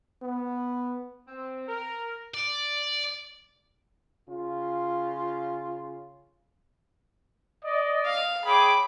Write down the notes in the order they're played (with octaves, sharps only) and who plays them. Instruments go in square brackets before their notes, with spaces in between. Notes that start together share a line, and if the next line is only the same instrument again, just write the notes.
[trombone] B3
[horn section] C4
A#4
[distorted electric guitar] D5
[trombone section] C#3 F4
[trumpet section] D5 D#5
[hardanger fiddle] F5
[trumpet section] G#4 C#5 G5 [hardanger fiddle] B5 D6